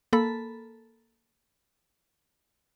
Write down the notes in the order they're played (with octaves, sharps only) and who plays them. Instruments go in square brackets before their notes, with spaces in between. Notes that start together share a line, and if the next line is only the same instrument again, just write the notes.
[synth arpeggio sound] A#3 A4 B5